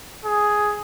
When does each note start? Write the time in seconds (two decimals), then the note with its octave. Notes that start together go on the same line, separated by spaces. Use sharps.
0.25 G#4